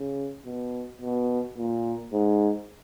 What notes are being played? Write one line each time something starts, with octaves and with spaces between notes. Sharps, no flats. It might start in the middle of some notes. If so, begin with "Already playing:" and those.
Already playing: C#3
B2
B2
A#2
G#2